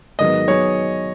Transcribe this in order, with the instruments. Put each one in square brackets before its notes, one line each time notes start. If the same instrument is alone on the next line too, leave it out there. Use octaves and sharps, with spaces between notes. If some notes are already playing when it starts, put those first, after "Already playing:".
[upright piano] G#2 D#3 F#3 B3 [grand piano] D#5
[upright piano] B2 F#3 B3 D#4 G#4 [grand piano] C#5